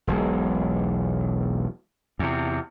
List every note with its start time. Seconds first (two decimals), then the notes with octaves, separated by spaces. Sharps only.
0.07 E1 B1 G#3
2.19 E2 C3